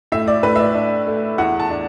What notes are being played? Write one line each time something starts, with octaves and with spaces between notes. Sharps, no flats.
A2 E5
D5
A2 B4
E5
D5
D4
A3
E2 F#5
A5
D4